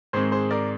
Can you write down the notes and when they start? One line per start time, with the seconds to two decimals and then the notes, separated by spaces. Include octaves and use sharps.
0.13 G#2 D#3 G#3 C4 G#4 C5
0.32 G#4 C5
0.51 A#4 D5